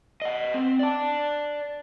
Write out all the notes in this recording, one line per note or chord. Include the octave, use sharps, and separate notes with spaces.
D#5 F#5
C4
D5 A5